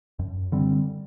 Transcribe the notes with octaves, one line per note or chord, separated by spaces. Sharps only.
F#2
D3 G3 C4